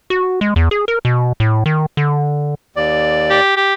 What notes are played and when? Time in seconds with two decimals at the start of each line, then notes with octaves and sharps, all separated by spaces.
0.10 F#4
0.41 G#3
0.56 E2
0.71 G#4
0.88 A#4
1.05 B2
1.40 A2
1.66 D#3
1.97 D3
2.76 D#2 D5
3.30 G4
3.56 G4